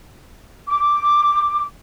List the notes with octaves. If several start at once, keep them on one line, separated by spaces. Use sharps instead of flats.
D6